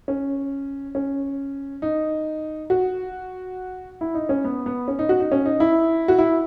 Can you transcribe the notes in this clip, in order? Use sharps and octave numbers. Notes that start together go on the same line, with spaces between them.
C#4
C#4
D#4
F#4
E4
D#4
C#4
B3
B3
C#4
D#4
F#4
D#4
C#4
D#4
E4
F#4
E4